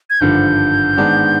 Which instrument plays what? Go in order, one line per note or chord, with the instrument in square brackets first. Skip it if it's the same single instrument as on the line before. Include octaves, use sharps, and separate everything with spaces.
[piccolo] G#6
[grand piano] G#1 G2 D3 F3 [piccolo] G6
[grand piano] G#2 D#3 G#3 B3 D4